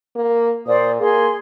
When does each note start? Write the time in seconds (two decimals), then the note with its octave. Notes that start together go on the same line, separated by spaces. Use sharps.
0.15 A#3
0.66 A#2 C5 D5 D#6
1.01 A#3 G#4 C6